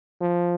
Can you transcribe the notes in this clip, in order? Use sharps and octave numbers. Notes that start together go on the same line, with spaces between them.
F3